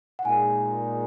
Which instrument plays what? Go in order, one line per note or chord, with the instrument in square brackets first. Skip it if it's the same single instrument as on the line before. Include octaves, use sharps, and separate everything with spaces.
[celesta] F#5
[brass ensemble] A#2 G#3 D#4 [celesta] G#5